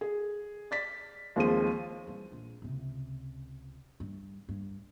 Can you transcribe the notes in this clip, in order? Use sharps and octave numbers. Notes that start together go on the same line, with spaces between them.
G#4
D5 A6 B6
D#2 F3 G#3 C4 G#4 D#7
E3 G3
A#1
C#2 C3
G2
G2